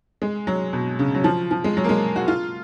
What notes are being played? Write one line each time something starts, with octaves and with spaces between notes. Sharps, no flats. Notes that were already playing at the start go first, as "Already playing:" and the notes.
G#3
F#3
B2
C#3
F#3
F3
F3
G#3
F#3
A#3
G#3
F#4
F4